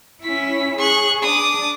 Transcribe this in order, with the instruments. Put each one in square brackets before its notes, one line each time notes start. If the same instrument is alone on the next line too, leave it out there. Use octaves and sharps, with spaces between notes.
[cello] C#4 E4 [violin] B6
[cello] G#4 [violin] C#6 F#6
[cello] D4 [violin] D6 D#6